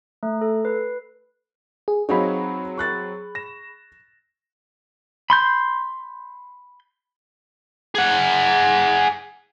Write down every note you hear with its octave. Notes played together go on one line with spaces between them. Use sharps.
A3
A4
B4
G#4
F#3 C4 D#4 F#4 G#4 C#5 F5 B5
C#6 F#6 A6
A#6 E7
B5 C6 G6
G#4 F#5